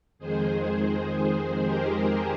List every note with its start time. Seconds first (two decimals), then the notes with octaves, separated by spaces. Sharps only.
0.19 F2 D#3 G#3 G#4 C5
1.63 G4 A#4